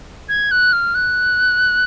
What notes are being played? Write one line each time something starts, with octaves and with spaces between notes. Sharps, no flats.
G#6
F#6
F6
F#6